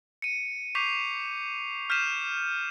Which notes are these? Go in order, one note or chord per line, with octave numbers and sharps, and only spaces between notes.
C#7 D#7
C#6 D6 G6 B6 C7 F7
F6 G6 B6 C7 D#7 E7